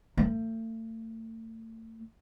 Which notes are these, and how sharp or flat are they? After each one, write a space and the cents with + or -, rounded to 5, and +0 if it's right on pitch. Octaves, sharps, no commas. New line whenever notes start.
A3 +35